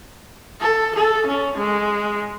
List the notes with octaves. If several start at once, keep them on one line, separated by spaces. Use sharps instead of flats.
A4
A4
C#4
G#3